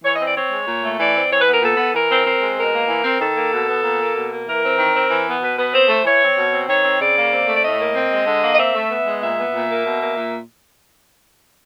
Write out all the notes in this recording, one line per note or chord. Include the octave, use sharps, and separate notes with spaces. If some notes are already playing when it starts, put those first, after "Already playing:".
E3 C#5
D#5
C4
D5
C4 C#5
G#3
A#2
A3
E3 D5
C4
E3 C#5
B4
B3 A#4
A#2 A4
B3
E3 A#4
C4
C4
G#3
B2 A#4
A#3
E3
C4
D#3 A4
A#3
B2
B3
A#2
A#3
B2
A#3
E3 A#4
C4
D#3
C4
E3
B3
B2 B4
B3 B4
C4 C5
A3
E3 C#5
C4
B2
C4
D#3 C#5
C4
C#3 D5
A#3
C4
A3
D5
A2 D#5
A#3
C4
G#3
D3
A#3
D#5
C4 E5
A3
B3
G#3
A#2 E5
B3
A#2
A#3
B2
A#3
A#2